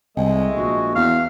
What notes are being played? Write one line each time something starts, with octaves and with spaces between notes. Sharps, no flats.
C2 G#3 A3 D#5
A#1 F#4
E2 F5